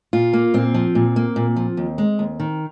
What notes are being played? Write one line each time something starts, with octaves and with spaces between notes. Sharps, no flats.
A#2 F4
A#3
A#2 C4
F3
A#2
A#3
A#2
F3
D#2
G#3
D#2
D#3